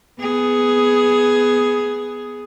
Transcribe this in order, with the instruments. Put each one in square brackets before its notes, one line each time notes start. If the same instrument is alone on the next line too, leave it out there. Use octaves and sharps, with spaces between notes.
[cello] B3 G#4